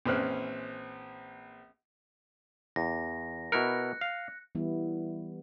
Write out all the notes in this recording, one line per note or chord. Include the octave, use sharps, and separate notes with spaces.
A#1 E3 C4 C#4 F6 F#6
E2 A#6
B2 E4 A#4 F#6 C#7
F5
E3 G3 B3 E4